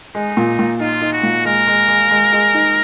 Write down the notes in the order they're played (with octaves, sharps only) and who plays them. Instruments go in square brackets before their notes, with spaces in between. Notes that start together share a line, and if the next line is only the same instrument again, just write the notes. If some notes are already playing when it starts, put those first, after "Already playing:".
[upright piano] G#3 [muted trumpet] D#4
[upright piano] A#2
A#2
[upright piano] D#4 [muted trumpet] F4
[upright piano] D#4
[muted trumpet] F#4
[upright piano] A#2
[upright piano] G#3 [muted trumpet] A#4
[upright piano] G#3
G#3
G#3
G#3
D#4